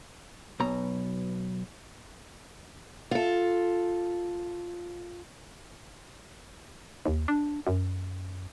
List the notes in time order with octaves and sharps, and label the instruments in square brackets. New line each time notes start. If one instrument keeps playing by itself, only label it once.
[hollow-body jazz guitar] B1 B2 A#5
[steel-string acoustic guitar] F4 A4
[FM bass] D#2
D4
F#2